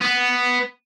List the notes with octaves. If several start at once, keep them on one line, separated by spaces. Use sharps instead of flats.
B3